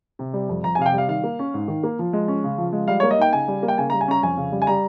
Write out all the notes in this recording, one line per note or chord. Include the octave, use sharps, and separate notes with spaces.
C3
G3
F2
F2 A#5
G#5
C3 F5
G5
G3 F5
D#3 F5
A#3
C#4
G#2
D#3
A#3
F3
G#3
C#4
C#3
F3
G#3
G3 F5
C#5
A#3
D#5
D#4 G5
C#3 G#5
G3
A#3
G5
C#3 G#5
A#5
G3
G#5
C#4 A#5
F2 G#5
C#3
G3
G#5
G3 A#5